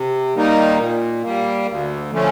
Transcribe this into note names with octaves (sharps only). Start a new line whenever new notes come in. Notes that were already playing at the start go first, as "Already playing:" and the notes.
Already playing: C3
D#3 G3 A#3 D#4
A#2
G3 A#3
D2
D3 F3 A3 C#4